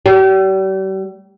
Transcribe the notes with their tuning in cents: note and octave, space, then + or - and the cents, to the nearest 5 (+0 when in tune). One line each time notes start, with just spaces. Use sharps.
G3 -40